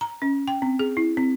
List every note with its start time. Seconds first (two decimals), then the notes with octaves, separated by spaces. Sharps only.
0.01 A#5
0.22 C#4
0.48 G5
0.62 C4
0.79 G#4
0.97 E4
1.17 C4